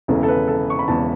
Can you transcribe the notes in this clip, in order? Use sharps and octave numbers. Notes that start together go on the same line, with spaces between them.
E1 E2 C#3 E3 A4
A4
B4
A4
C#6
B5
E1 E2 C#3 E3 A5